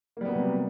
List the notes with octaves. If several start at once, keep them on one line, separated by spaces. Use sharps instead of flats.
C3 F#3 G3 A#3 B3